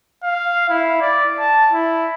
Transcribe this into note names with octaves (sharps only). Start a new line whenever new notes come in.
F5
E4
D5
A5
E4